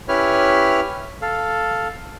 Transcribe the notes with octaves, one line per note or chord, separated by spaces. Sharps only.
C#4 E4 G4 B4 C#5 F6
A4 F5